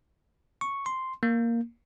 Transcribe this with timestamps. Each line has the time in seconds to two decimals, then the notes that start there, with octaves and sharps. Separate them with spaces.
0.61 C#6
0.86 C6
1.23 A#3